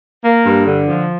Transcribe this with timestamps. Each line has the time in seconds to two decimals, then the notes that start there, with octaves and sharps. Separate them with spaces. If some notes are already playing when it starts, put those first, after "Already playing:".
0.24 A#3
0.46 G2
0.66 D3
0.87 F3